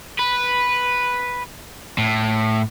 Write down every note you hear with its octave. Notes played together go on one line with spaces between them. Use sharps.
B4
A2